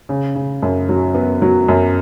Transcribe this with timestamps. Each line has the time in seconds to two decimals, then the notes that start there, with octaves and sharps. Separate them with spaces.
0.09 C#3
0.35 C#3
0.62 F#2
0.89 F#3
1.15 B3
1.42 F#3
1.68 F#2